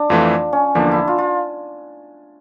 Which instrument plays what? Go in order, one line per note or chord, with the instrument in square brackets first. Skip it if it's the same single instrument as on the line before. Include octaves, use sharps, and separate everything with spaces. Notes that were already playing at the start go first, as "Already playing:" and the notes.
Already playing: [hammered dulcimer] D4
[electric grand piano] F2 E3 A3 [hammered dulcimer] F4
[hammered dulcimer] C#4
[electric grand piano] E2 D3 F3 A#3 [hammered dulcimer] D4
[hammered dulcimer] E4
F4
F4